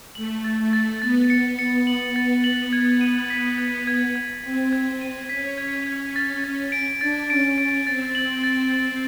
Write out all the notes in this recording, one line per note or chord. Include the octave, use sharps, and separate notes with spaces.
A3 F#7
A6
A3
A6
B3 A6
C#7
C#7
F#7
A6
F#7
G#6
D#7
B6
G#6
G#6
G#6
C4 B6
G#6
D#7
C#4 B6
G#6
G#6
A6
A6
D7
D4 A6
C#4 D7
C#4 D7
C4 A6
F#7
A6
F#7